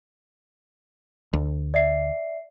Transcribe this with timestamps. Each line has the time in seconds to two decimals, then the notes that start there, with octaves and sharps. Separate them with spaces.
1.33 D2
1.74 D5 E5 C7